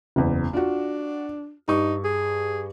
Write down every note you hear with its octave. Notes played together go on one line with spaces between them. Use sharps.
F#1 E2
D4 F4 F#4
G2 D#4 C#6
G#4